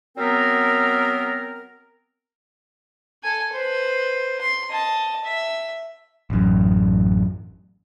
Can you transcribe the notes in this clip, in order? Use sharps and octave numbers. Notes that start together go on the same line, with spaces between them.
F#3 B3 C4 A#4
A4 G#5
B4 C5
C6
D#5 A5
E5
A1 F#2